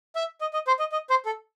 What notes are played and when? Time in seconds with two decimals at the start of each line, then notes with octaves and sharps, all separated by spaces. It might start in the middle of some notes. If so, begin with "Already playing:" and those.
0.16 E5
0.41 D#5
0.53 D#5
0.67 C5
0.79 D#5
0.92 D#5
1.10 C5
1.26 A4